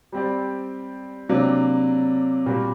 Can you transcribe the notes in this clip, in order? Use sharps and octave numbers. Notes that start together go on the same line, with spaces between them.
G3 C4 G4 D5
C3 F#3 A#3 D4
A#2 G3 A#3 F#4